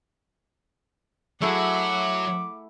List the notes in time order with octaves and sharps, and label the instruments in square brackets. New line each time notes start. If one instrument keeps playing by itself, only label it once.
[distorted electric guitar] F#3 [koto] A3 E4 G#4 [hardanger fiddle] E5 F#5 [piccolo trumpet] D6